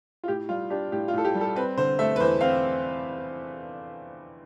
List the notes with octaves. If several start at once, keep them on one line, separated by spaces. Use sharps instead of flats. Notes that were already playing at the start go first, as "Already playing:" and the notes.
F4
A2 G4
G3 F4
D4 G4
A2 G4
F4
A2 A4
G4
G3
A4
C4 B4
D3 C5
A3 E5
B4
E2 C5
C4 F5